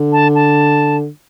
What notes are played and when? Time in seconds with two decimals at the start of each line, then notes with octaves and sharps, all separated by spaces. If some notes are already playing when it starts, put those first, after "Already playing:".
Already playing: D3
0.13 A5
0.35 A5